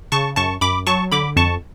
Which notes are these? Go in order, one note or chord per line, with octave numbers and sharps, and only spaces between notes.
C#3 A5 C#6
F#2 A5 C#6
F#2 B5 D6
F#3 A5 C#6
D3 B5 D6
F2 A5 C#6